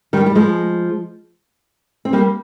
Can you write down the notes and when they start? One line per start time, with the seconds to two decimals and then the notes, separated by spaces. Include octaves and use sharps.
0.13 D#3 G3
0.26 G3
0.35 F3 G#3
2.05 C4
2.13 G3 A#3